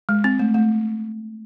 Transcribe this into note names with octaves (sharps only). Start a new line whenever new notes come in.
G#3
C4
A3
A3